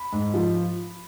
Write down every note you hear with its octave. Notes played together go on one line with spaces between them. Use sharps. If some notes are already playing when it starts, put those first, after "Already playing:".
Already playing: B5
G#2
F3